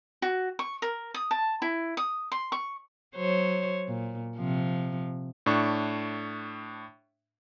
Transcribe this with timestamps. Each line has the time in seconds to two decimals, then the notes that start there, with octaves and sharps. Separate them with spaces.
0.22 F#4
0.59 C#6
0.82 A#4
1.14 D#6
1.31 A5
1.62 E4
1.97 D#6
2.32 C6
2.52 C#6
3.15 F#3 C5 C#5
3.87 A#2
4.37 C3 F3
5.46 A2 D4 C#6